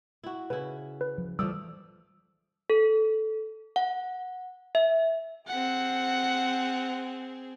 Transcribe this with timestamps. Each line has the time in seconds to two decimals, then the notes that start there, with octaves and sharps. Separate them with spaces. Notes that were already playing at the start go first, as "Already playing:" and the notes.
0.24 E4 F#4
0.50 C#3 E4 B4
1.01 B4
1.18 F3
1.39 E3 F3 G3 A3 D5 D#6 E6
2.70 A4
3.76 F#5
4.75 E5
5.47 C4 G#4 F#5